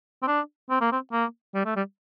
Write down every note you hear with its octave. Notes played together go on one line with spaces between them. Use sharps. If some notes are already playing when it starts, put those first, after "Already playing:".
C4
D4
C4
A#3
C4
A#3
G3
A3
G3